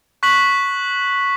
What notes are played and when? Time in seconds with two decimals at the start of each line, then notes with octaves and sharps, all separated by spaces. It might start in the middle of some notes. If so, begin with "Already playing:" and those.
0.23 C#6 F#6 B6 F#7